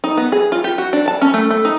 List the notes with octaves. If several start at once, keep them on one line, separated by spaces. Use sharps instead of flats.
D#4
B3
G#4
F4
G4
F#4
D4
A5
C#4
A3
A3
D#4